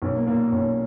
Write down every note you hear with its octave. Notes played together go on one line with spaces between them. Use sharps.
B1 C#4
A#3
A#2 A#3
B1 C#4